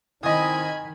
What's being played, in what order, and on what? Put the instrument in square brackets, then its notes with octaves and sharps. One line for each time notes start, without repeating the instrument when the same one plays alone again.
[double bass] D#3 [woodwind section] C4 E4 [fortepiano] D#5 D#6 [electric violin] G#5 B5